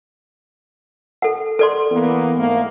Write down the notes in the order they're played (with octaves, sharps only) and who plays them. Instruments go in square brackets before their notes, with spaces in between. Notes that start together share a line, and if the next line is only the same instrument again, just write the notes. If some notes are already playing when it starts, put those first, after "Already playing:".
[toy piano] A4 F#5
A4 D5 C6
[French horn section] E3 A#3 B3
G#2 A3 A#3